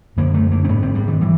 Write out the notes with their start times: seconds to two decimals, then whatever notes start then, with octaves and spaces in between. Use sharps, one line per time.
0.17 F#2 D3 A#3
0.34 A3
0.52 A#3
0.65 C4
0.68 G#2 B3
0.82 C4
0.95 G3
1.08 D#3
1.21 E3